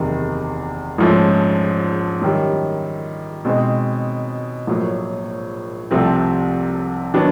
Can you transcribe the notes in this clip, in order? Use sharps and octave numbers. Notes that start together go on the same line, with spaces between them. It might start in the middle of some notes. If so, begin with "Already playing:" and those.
Already playing: F#1 E2 C3 D#3
A#1 G#2 F3 A3 C#4
F#2 D#3 G3
B2 G#3 C4 D#4 G#4
A#1 A2 F#3 A#3
C2 C3 F3 A3 C4
D#3 F#3 B3 D4